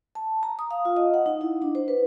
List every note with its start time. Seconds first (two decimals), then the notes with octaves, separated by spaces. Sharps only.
0.15 A5
0.43 A#5
0.59 D#6
0.71 F5
0.85 F4
0.97 D#5
1.14 F#5
1.26 D#4
1.41 E4
1.62 D4
1.75 C5
1.88 B4